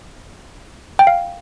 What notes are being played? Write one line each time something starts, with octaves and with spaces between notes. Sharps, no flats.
G5
F5